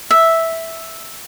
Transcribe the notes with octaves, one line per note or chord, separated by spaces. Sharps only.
E5